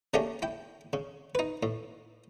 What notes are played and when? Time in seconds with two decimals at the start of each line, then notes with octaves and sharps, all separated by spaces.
0.14 C#3 A3 A#3 C#4 D4 G4
0.42 E4 G5
0.93 C#3
1.35 D#4 B4
1.63 A2